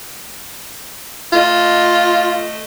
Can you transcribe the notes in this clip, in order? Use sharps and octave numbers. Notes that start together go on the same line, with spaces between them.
A3 F4 D#5